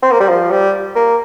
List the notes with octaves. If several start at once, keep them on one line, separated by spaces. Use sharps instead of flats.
C4
A#3
G3
F3
G3
A#3